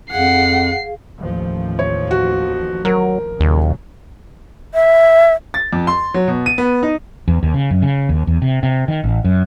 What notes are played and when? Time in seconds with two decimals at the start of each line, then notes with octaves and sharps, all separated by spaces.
0.12 F2 G#4 F5 F#5 C7
1.19 A1 D#2 F3
1.79 C#5
2.11 F#4
2.85 F#3 A#4
3.40 D#2 A#2 C#3 F#3
4.74 E5
5.54 A6
5.73 F2
5.87 C6
6.14 F#3
6.28 B2
6.46 D#7
6.58 B3
6.83 D#4
7.28 E2
7.43 D#2
7.54 C#3
7.70 F#2
7.82 C#3
8.09 D#2
8.27 E2
8.42 C3
8.63 C3
8.88 D#3
9.04 A1
9.25 F#2